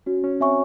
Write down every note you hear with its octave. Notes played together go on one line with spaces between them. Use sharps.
C#4 F#4
C#4
C4 C#5 E5 G#5 C#6